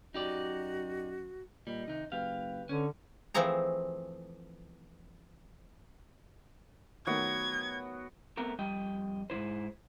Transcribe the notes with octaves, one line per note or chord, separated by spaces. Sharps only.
F#2 D#4 F#4 G4 D5
A#2 G3 D#5
C3 D#3 D#4
F#1 G4 B4 F5
D3 C#4
E3 F3 A3 C4 G#4 A#5
D#3 F#3 A3 B3 F#5 G#6
A3 B3 C4 A#4
F2 G3 D#5 G5
G#2 D#3 E4 C5